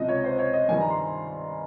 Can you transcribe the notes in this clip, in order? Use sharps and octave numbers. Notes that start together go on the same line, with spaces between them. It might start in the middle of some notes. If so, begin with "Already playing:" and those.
Already playing: C#2 C3 F3 D#5
C#5
C5
C#5
D#5
G2 D#3 G3 G#5
A#5
C6